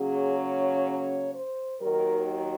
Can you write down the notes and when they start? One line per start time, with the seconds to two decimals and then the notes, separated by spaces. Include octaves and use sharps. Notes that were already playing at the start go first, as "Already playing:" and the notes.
Already playing: C#3 F#3 A#3 C#4 G#4
0.37 C#5
0.85 C#5
1.33 C5
1.80 D#2 D#3 F#3 A#4